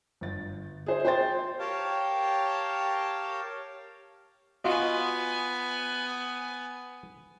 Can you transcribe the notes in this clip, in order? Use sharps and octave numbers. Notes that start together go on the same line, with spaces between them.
G1 A6
G#4 C5 E5
C5 G5 C6 G6 A6
G4 A#4 C#5 F5 G5 A5
B3 F4 F#4 D#5 G#5